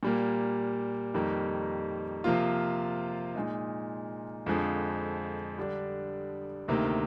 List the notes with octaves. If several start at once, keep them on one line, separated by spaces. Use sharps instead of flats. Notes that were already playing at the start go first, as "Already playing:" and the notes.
A#2 G3 A#3
F2 D#3 G3 A#3 D#4
C3 F3 A#3 F4
A#2 G#3 D#4
F2 D3 F3 G#3
D3 G3 D4
D2 C3 D#3 A#3